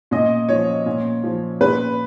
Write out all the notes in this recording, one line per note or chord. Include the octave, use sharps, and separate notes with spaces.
A#2 D#5
F3 C#5
A#2
F3
A#2 B4